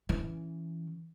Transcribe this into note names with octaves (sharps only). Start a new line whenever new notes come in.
E3 C#4